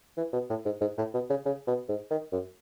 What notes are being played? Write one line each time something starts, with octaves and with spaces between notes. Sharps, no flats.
E3
B2
A2
G#2
G#2
A2
B2
C#3
C#3
B2
G#2
D#3
F#2